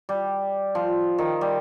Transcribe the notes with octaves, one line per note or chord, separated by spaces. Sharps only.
G3
F3
D#3
G3